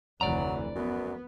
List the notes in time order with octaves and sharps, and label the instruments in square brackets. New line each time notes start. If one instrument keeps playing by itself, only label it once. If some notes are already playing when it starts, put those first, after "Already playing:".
[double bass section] F1 D2 E3 [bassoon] F#3 [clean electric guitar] D5 A#5
[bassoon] F#2 [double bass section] B3